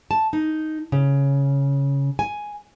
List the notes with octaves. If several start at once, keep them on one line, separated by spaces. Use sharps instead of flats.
A5
D#4
C#3
G#5